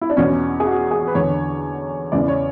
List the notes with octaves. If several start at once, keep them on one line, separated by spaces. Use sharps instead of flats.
E4
D4
E2 B2 C#4
G#4
F#4
G#4
B4
E2 D3 C#5
E2 C#3 E3 D5
C#5